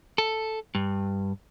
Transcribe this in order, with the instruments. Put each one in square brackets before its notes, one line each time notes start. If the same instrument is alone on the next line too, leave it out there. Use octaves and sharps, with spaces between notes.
[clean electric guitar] A4
G2